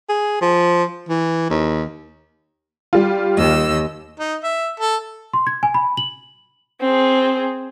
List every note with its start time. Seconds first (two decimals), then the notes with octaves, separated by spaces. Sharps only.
0.09 G#4
0.41 F3
1.09 E3
1.50 D#2
2.93 G3 F4
3.37 D#2 D#5 E6
4.19 D#4
4.44 E5
4.80 A4
5.34 C6
5.47 G#6
5.63 G#5
5.74 B5
5.97 F#7
6.81 C4 G#4